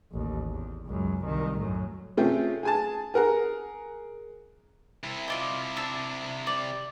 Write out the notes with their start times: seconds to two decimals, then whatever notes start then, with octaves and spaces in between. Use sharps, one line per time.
0.12 A1 D#2
0.51 E2
0.86 C#2 F#2
1.22 C2 D#3
1.58 F#2 A2
2.17 C3 A3 C#4 F4 G#4 G5
2.63 G#4 G#5 A5
3.14 G#4 A#4 F#5 A#5
5.03 C3 E4
5.28 F4 D5 D#5
5.76 D4 A5 E6
6.47 D5